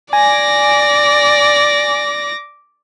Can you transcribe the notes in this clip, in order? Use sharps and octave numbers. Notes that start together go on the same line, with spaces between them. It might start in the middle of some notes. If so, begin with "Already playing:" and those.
D5 G#5 D6 A#6